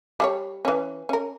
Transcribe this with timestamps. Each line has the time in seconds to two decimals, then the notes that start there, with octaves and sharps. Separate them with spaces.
0.20 G3 G#4 C#5
0.65 E3 C#4
1.09 C#4 A#4